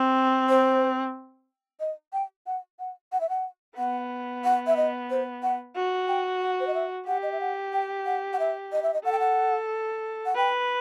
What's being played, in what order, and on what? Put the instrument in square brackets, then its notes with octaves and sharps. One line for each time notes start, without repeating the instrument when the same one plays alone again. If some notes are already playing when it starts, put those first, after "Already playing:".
Already playing: [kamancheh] C4
[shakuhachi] C5
D#5
G5
F#5
F#5
F#5
E5
F#5
[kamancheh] B3 [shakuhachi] F#5
[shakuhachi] F#5
E5
D#5
C5
F#5
[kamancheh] F#4
[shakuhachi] G5
F#5
C5
D#5
E5
[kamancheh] G4 [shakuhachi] F#5
[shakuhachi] D#5
E5
F#5
G5
F#5
F#5
E5
D#5
E5
D#5
[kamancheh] A4 [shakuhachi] F#5
[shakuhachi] G5
F#5
F#5
[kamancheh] B4 [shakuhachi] G5